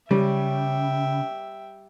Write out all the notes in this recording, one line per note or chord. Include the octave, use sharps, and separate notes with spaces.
C#3 G3 E5 G5